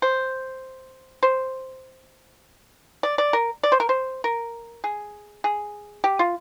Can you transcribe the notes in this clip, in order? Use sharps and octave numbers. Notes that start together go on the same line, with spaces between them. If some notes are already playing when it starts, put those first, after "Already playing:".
C5
C5
D5
D5
A#4
D5
C5
A#4
C5
A#4
G#4
G#4
G4
F4